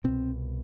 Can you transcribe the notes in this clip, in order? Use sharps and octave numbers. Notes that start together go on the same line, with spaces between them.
C2 B2 C4